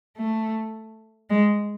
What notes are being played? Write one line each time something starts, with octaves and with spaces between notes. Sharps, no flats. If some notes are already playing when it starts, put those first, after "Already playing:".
A3
G#3